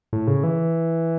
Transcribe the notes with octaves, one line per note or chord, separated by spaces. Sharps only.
A2
C#3
E3